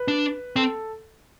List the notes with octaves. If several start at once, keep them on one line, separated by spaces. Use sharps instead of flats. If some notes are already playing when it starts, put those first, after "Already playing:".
Already playing: B4
D4
C4 A4